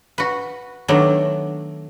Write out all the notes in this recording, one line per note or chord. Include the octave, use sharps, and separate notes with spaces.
F#4 B4
D#3 F#3 A3 B3 D4